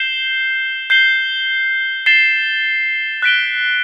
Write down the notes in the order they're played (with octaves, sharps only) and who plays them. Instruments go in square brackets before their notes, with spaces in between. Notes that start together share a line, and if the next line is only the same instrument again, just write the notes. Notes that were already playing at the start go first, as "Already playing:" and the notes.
Already playing: [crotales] G6 C7 E7 G7
G6 C7 G7
A6 C7 E7 G7
F#6 B6 D7 G7